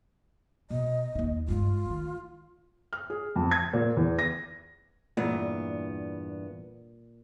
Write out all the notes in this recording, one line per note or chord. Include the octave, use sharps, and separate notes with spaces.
B2 D#5
D#2 D#4
G2 G#3 F4
D#3 A3
F6
G#4
F2
G#6
A#2
E2
A#6
E2 G2 A#2 B3